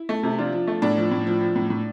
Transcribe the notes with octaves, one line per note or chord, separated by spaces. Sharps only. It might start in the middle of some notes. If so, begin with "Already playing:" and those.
Already playing: E4
A3
C3
F3 D4 F4
F3
A3
A2 D4
F3
A2
F3
F3
A2
A2